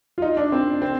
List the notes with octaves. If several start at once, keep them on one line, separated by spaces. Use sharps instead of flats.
F4
D#4
D4
C4
C4